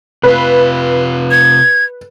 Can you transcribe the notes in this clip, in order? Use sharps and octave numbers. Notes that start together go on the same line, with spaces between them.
C3 F4 B4
G#6